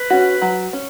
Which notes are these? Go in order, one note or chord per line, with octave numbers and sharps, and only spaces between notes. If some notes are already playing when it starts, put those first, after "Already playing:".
Already playing: B4
C#4 F#4
F#3
C#4